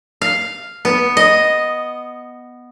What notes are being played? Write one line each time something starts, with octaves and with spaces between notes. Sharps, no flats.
F5
B3
D#5